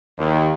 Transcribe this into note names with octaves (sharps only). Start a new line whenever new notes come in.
D#2